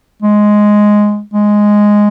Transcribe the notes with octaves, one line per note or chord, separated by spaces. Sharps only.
G#3
G#3